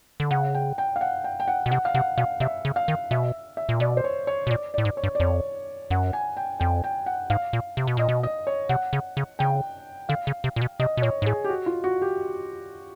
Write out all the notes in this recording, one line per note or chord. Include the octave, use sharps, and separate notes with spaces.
D3
C#3 F#5
G5
G5
F5
F#5
G5
G5
F#5
B2
C3 F#5
F5
C3 F#5
B2 F5
C3 E5
C#3
F5
D#3
B2 E5
E5
A#2
B2 D5
C5
C#5
C#5
B2
A#2 D5
A2 D5
G#2
C#5
G2
D5
F2 C#5
F#2 F#5
G#5
G5
F2 G5
G5
F#5
G#2 F5
A#2
C3
B2
A#2 D#5
B2
D#5
C#5
C3 F#5
C#3
C#3
C#3 G5
D3 F5
C#3
C3
A#2
B2
C3 D#5
B2
A#2 C#5
G#2
A2 G#4
G4
F#4
F4
F#4
G4